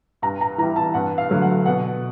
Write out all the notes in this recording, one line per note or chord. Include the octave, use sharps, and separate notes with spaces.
G2 A#5
A#5
E3 G3 A#5
A5
G2 F#5
F5
D3 F#3 A3
F#5
B2 F#5